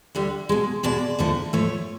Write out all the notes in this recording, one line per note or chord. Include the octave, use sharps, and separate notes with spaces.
D2 D3 G3
B2 G#3
E2 B2 G#3 D5
D#2 D3 F3 A3
G#2 F3 A3 C#5